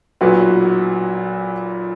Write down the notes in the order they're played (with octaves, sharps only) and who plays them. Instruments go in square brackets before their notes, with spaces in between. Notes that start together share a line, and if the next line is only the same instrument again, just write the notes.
[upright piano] B1 A#2 F#3 B4